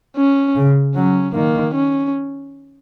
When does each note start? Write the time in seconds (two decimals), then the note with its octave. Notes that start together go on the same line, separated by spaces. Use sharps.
0.16 C#4
0.56 C#3
0.95 F#3 C#4
1.35 D#3 A#3
1.75 C#4